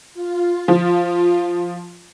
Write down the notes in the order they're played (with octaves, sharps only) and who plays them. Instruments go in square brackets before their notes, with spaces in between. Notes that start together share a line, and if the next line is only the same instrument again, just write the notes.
[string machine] F4
[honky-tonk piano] F3